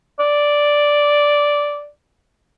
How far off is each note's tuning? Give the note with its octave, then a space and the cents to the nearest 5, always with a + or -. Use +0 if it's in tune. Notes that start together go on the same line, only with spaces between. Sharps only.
D5 -5